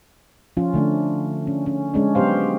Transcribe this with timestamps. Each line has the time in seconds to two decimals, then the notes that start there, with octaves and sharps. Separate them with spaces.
0.57 F3 C#4 F4
0.74 D3 A3 D4
1.47 C#4
1.66 C#4
1.94 G#3 C#4 D4
2.15 F#3 B3 G4 C5 F5